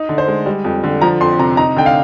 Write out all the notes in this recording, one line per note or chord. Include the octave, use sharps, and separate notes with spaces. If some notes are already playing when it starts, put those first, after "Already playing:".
Already playing: D#4
D3
C5
G#3
G3
F2
D3
F3 A#5
F2 C6
C3 A#5
D#4 A#5
D3 G5
F5